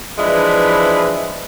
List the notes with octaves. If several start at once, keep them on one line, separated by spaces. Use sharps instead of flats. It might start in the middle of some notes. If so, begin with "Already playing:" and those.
E3 F3 G#3 D4 E4 B4